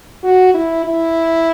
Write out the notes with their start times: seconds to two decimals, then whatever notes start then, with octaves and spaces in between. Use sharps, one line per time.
0.24 F#4
0.54 E4
0.84 E4